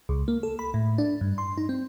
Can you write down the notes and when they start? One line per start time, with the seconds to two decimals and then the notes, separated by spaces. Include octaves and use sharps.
0.09 C#2
0.28 A#3
0.43 A4
0.59 B5
0.74 A2
0.98 D4
1.21 G2
1.38 C6
1.58 D#4
1.69 C4